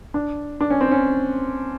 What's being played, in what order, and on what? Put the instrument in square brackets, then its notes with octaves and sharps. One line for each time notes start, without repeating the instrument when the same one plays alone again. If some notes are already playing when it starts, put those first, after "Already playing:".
[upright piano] D4
D4
C#4
C4
C#4